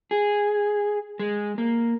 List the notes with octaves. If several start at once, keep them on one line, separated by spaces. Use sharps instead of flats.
G#4
G#3
A#3